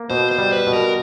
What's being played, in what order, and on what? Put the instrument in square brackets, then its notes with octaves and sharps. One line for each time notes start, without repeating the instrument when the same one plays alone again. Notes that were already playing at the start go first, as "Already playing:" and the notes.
Already playing: [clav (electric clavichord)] A#3
[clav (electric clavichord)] B2 [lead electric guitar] C5
[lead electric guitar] C5
[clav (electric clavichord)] G3
[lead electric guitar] B4
[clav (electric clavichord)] B2
[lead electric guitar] A#4